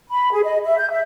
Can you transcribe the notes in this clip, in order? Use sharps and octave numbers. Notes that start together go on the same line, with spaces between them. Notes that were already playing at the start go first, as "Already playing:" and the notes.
B5
G#4
D#5
E5
G6
E5